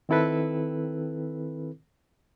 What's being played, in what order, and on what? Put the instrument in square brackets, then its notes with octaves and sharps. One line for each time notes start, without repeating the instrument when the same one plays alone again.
[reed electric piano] D#3 C4 E4 A4 B4